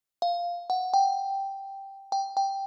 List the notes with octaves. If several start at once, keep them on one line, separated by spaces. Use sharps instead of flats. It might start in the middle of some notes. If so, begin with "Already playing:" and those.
F5
F#5
G5
G5
G5